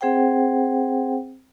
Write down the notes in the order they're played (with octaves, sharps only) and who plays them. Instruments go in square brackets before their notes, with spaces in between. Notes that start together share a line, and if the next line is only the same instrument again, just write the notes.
[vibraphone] C4 G#4 C5 F#5 G5